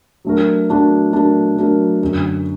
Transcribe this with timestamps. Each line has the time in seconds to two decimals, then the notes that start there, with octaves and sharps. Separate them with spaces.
0.25 F#3 A3 D4 F#4 A#4
0.69 F#3 A3 D4 F#4 A#4
1.13 F#3 A3 D4 F#4 A#4
1.58 F#3 A3 D4 F#4 A#4
2.01 F#2 D3 F#3